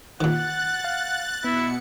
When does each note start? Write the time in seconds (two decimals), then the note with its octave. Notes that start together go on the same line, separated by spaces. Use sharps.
0.21 A#2 D#3 F#5 F#6 A6
0.84 F5
1.44 B2 B3 E4 C#7